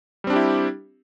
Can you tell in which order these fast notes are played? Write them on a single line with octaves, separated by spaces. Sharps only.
G3 C4 D4 G4 E4